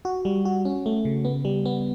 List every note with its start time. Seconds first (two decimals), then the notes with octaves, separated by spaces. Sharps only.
0.05 F#4
0.25 G3
0.45 F#4
0.65 C#4
0.86 A3
1.05 C#3
1.25 B3
1.45 G3
1.66 B3